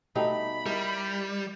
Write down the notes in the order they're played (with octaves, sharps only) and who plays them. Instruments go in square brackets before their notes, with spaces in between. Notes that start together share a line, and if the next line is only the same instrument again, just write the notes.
[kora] B2 G3 A3 [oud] D#4 [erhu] B5
[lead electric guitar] G3 [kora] E4 A#4 D#5